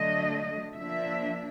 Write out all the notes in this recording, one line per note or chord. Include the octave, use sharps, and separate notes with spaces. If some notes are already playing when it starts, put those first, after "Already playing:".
Already playing: D3 F#3 A3 D4 D#5
F3 A#3 D4 E5